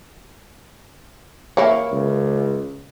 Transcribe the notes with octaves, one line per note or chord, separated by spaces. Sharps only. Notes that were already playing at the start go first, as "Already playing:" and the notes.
E3 A#3 E4 C#5
C#2